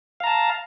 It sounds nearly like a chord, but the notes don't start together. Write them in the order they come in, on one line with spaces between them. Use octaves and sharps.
F5 A#5 A5